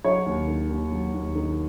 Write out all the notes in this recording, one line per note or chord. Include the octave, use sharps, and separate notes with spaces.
F#3 C#5
D#2
D#3
D#2
F#3
D#2
D#3